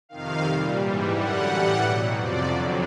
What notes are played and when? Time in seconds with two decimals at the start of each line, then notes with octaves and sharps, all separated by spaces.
0.09 F2 C3 D#3 F5
0.43 A#2 G3
0.77 G#2 E3 G3
1.11 F#2 D3 G3 F#5
1.45 A2 E3 G3 F#5
1.78 B2 F#3 G5
2.12 F2 C3 F3 D5
2.46 F2 D3 F#3